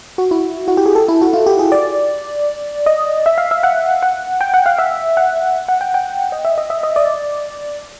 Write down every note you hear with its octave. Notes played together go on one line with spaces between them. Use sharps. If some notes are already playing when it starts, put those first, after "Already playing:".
F#4
E4
F#4
G4
G#4
A4
E4
F#4
F4
G4
G#4
D5
D#5
E5
F5
E5
F#5
F#5
G5
F#5
F5
E5
F#5
F#5
G5
G5
D#5
E5
D#5
E5
D#5
D5